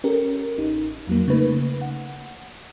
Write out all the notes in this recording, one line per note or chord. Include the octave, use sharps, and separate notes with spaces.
C#4 G4 A4 A#4
A1 D#4
F2 F#3 A#3
C#3 A3 A#3 D#4 B4
F#5